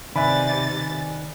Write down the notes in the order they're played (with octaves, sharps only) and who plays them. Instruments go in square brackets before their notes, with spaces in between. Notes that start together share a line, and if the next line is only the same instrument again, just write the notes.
[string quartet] C3 A6 [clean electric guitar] D#3 B4 [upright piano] D5 G#5 [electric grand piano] E5 B5